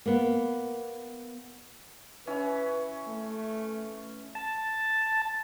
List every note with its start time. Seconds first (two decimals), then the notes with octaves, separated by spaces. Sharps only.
0.06 A#3 B3
2.27 E3 C#4 B4
3.08 A3
4.35 A5